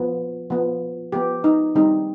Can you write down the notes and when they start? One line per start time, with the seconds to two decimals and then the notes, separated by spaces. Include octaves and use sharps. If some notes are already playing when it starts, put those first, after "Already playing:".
Already playing: F3 B3
0.50 F3 B3
1.12 F3 B3 G4
1.44 D#4
1.75 D#3 G3 C4 D#4